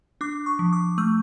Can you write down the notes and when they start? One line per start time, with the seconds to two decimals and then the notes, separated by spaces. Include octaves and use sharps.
0.21 D4 D6
0.46 C#6
0.59 F3
0.73 D6
0.98 A3 E6